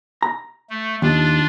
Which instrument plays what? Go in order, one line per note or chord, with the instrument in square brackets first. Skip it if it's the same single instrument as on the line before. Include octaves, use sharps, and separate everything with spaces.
[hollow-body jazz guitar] A#5
[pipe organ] A3
[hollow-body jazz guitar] D#2 [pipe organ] D4 F4